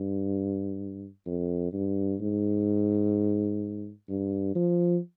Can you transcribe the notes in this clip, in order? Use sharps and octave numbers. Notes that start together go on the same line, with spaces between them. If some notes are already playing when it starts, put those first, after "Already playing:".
Already playing: G2
F2
G2
G#2
G2
F3